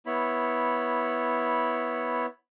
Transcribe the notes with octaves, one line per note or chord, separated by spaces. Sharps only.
B3 E4 C#5 B5